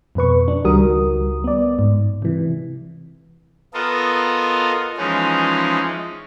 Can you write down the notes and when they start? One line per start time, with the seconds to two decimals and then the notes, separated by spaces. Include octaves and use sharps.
0.15 F2 B2 B4 C#6
0.48 D4
0.65 C#2 D#3 G3 F#4 A#4 D#6
1.44 B3 D5
1.79 G#2
2.22 C3 E3
3.74 B3 F4 A4 A#4 D#5
4.98 E3 F3 G#3 C#4 D#4